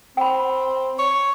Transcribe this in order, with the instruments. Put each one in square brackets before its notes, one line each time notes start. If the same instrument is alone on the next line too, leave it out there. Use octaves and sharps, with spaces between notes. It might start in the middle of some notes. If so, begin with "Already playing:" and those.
[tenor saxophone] C4 [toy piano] G5 B5
[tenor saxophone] C#5